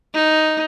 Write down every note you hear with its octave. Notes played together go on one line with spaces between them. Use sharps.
D#4